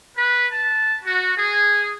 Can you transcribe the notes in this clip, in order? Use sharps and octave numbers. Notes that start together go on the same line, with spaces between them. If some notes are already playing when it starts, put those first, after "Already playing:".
B4
A5
F#4
G#4